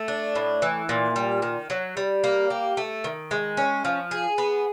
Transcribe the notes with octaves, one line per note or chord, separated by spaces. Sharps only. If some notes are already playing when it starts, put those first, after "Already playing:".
Already playing: A3
D4
A2
E3
A#2
G3
D#3
F#3
G3
A#3
G4
A3
D#3
G#3
C#4
F3
G#4
B3